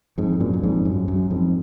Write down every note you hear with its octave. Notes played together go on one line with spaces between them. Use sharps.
F2 G#2
F#2 A#2
F#2
F2 G#2
F#2
F#2
F2 G#2